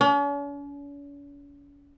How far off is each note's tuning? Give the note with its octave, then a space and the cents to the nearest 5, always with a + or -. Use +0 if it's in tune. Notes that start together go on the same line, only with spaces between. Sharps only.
C#4 +45